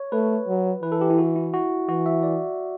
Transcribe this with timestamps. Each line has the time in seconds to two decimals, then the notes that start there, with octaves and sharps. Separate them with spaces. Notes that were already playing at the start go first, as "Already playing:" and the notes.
Already playing: C#5
0.12 A3 B4
0.48 F#3
0.82 E3 B4
0.92 A4
1.01 G4
1.10 E4
1.18 F#4
1.36 E4
1.53 F#4
1.89 E3 F#4
2.06 E5
2.23 D5